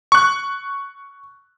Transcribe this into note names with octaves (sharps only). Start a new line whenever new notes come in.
C#6 F#6